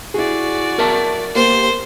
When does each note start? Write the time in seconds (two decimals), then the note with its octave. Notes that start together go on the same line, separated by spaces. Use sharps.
0.14 E4 F#4 G#4 D5
0.79 F#3 A#4 E5 A5
1.35 A#3 G4 C5